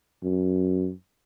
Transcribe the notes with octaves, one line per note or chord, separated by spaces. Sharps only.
F#2